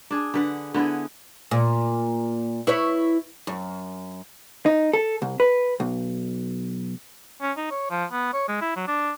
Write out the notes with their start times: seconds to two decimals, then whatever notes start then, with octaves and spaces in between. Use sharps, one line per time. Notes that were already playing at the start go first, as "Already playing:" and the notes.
0.11 D4 G#4
0.34 D3 B4 F#5
0.74 D3 B3 E4 G#4
1.51 A#2
2.67 E4 B4 C#5
3.47 F#2
4.66 D#4
4.93 A4
5.22 C2
5.40 B4
5.80 B1
7.42 C#4
7.57 D#4
7.71 C#5
7.90 F3
8.12 B3
8.33 C#5
8.48 G#3
8.61 E4
8.76 F#3
8.88 D4